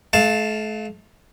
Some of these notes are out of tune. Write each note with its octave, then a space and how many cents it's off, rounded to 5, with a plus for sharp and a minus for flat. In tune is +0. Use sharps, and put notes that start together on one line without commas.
A3 -40 F5 +0 A5 +0